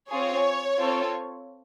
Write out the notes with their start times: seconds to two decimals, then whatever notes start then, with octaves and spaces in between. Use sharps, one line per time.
0.11 C4 F4 G#4 C#5
0.81 C4 F4 A4